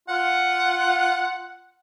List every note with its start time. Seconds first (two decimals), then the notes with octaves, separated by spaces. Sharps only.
0.09 F4 F#5